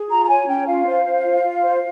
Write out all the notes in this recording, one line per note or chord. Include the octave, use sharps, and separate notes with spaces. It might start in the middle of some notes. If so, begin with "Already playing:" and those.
Already playing: G#4
F4 A#5
A#5
C#5 G#5
C#4 G5
F4 F5
C5
C5
F4
F4
C5